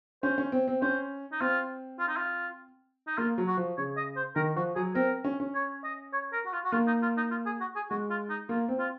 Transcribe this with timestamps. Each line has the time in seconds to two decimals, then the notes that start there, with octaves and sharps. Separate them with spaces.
0.23 C#4 C5
0.38 C#4
0.52 C4
0.68 C4
0.81 C#4 C5
1.32 D#4
1.41 C4 F4
2.00 F4
2.08 D#4
2.17 F4
3.07 D#4
3.18 A#3 F4
3.38 F#3
3.47 F#4
3.57 F3
3.78 C#3 C#5
3.97 D#5
4.16 C5
4.36 D#3 A#4
4.56 F3 F#4
4.76 F#3 G#4
4.95 C4 A#4
5.24 C#4
5.40 C#4
5.55 C#5
5.84 D#5
6.13 C#5
6.33 A#4
6.46 F#4
6.53 F4
6.65 F#4
6.72 A#3 F4
6.87 D#4
7.02 F4
7.17 D#4
7.31 F4
7.46 G#4
7.60 F#4
7.76 G#4
7.90 G#3 F#4
8.10 F4
8.30 D#4
8.49 A#3 F4
8.68 C4
8.79 F4